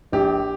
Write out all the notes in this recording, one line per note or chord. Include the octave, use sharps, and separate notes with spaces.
A#1 G4